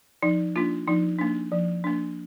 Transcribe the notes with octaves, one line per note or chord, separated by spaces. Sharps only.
F3 D#4
A#3 D4 F4
F3 D#4
A#3 D4
F3
A#3 D4